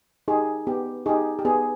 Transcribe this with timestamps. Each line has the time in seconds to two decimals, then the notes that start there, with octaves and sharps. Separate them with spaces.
0.28 D#4 G4 G#4
0.67 B3 G4
1.06 D#4 G4 G#4
1.39 G4
1.45 B3 G#4